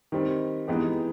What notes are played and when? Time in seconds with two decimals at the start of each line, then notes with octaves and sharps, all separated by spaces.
0.12 D#3 G3 C4
0.68 E3 G#3 B3 D#4 G4